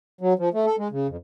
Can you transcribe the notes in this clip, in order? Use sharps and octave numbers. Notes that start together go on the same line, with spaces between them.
F#3
F3
A3
A4
G#3
C#3
F2